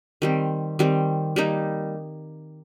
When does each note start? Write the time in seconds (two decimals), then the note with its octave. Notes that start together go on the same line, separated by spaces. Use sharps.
0.22 D#3 G3 C4
0.79 D#3 G3 C4
1.36 G3 A#3 D#4